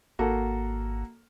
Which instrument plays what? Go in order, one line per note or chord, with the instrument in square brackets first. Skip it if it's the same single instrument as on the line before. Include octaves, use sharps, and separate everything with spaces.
[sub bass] G#1 [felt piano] A#3 F#4 A4